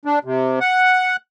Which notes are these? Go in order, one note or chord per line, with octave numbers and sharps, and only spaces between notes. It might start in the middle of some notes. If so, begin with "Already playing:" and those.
D4
C3
F#5